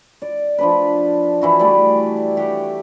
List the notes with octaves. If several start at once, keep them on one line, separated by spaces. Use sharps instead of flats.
D5
F3 D4 B4
E3 E4 F#4
G3 A3 B4 D5
G4 F#5